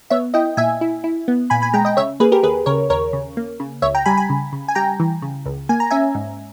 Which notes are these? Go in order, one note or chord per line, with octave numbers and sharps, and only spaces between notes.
B3 C#5 E5
E4 D#5 G5
A#2 E5 G#5
E4
E4
B3
A#2 G#5 B5
G#5 B5
G#3 G5 A#5
D#5 G5
C#3 C#5 E5
A#3 G#4 B4
G4 A#4
D#2 G#4 B4
C#3 A#4 C#5
D#2 A#4 C#5
C#3
A#3
C#3
C#2 C#5 E5
G5 A#5
G3 G#5 B5
G#5 B5
C#3
C#3
G#5
G3 G5 A#5
E3
C#3
C#2
A#3 G#5
A#5
C#4 E5 G#5
G#2